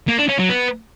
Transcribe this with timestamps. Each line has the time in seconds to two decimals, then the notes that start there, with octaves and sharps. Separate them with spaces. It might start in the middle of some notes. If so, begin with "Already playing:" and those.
0.09 A#3
0.19 D4
0.29 C#4
0.39 F#3
0.49 B3